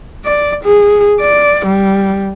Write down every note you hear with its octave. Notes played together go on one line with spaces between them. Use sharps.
D5
G#4
D5
G3